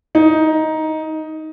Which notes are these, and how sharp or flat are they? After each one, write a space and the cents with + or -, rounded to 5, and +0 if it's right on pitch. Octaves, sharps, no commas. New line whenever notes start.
D#4 +10